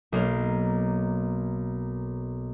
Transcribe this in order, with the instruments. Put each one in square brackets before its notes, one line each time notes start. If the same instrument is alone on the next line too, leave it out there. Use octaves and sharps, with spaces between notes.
[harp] B1 A#3